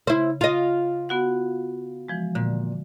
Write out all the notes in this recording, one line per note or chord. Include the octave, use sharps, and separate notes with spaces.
C#3 E4 C5
F4 D#5
B3 F#4 F#5
E3 F3 G#3
A#2 D3